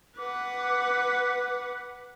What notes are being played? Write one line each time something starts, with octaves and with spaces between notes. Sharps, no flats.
B4 F#5 D6